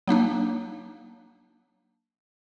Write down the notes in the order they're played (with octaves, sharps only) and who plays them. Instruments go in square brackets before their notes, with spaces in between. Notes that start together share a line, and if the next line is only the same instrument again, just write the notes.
[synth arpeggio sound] F#3 A#3 D4 D#4